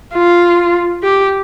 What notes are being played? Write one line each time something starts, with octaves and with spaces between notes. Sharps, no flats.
F4
G4